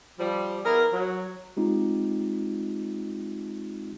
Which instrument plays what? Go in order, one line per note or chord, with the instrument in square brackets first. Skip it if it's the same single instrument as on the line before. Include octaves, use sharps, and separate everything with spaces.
[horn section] F3 G3
B3 E4 G#4 A#4
F#3
[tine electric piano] G#3 C4 D#4 F4 G4